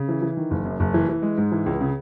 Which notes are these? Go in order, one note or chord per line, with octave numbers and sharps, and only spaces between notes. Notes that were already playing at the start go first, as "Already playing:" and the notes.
Already playing: C#3
E3
E3
D#3
F#1
F#2
F#1
E3
E3
G#3
G#2
E3
C#2
C#3